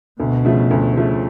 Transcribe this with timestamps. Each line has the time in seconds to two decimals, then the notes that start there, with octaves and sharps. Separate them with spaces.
0.20 D2 B2
0.45 C#3 F3 A3
0.71 D2
0.96 C#3 F3 A3